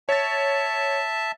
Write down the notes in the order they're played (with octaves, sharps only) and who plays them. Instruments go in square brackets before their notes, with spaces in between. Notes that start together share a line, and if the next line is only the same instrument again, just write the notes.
[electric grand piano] C#5 A6 [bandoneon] E5 A5